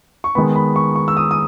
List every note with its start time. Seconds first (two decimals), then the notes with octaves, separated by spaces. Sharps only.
0.24 C#6
0.35 D#3 G#3 B3 B5
0.56 B5
0.76 C#6
0.96 C#6
1.08 E6
1.17 D#6
1.31 D#6